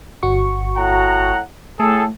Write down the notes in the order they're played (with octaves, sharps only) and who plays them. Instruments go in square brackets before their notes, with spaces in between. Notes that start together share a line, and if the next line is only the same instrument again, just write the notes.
[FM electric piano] G1 F#4 C#6
[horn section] A2 F#5 A#5
[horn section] A2 G#4 A4 [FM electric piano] A3